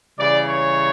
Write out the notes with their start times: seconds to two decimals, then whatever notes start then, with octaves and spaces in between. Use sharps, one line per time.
0.19 C#3 E3 G3 D5
0.47 C#5